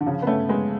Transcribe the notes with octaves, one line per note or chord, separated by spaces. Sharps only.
D3
C#3 F3
B3
A3 C#4
G#3 B3